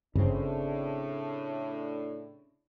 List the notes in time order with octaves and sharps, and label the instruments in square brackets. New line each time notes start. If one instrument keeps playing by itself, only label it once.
[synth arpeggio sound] G1 [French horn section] A2 D4 [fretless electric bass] C#3 C4